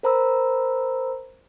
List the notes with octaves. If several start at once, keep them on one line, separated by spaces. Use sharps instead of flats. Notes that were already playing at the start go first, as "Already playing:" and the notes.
A#4 C5 A#5 B5 E6